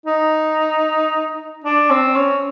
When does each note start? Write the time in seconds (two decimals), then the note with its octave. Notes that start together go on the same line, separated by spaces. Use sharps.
0.06 D#4
1.64 D4
1.91 C4
2.16 C#4